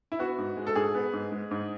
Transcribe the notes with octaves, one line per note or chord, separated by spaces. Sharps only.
E4
B3 F#4
G#2
G#3
A4
G#2 G#4
B3
G#2
G#3
G#2